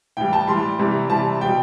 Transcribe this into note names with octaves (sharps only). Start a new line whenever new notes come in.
A2 E3 G3 G5
A5
A2 E3 G3 C6
C3 E3 G3
C3 E3 G3 A5
B2 G3 G5